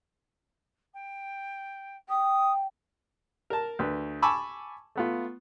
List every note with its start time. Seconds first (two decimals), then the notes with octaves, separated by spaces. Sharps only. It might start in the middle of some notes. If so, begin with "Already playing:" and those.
0.93 G5
2.09 G5 D#6
3.50 A#4 A5
3.79 D2 B4
4.22 G#5 A5 B5 C#6 D6 E6
4.96 A3 B3 F4